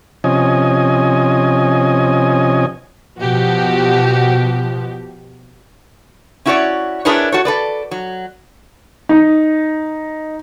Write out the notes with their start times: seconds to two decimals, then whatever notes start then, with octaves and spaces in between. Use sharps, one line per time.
0.24 C3 F3 C#4 D#5 G#5
3.21 B2 F3 F#4 G4
6.46 C#4 E4 F#4 G4 C#5 D5
7.05 D4 E4 G#4 A#4 B4 C#5
7.32 F#4 A4 C#5
7.45 A4 B4 D5
7.91 F#3
9.09 D#4